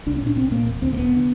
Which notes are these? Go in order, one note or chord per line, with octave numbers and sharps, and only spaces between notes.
C2 D4
C#4
A#2
D4
C2 C4
A#2 A#3
E1
D#2 D3 C4
A#3
E1 B3
D3